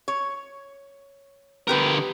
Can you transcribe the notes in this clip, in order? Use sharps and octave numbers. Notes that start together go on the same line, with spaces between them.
C#5
D3 B3 G4 A#4 B4